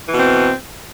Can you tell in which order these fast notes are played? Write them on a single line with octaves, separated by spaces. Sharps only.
E3 B2 C4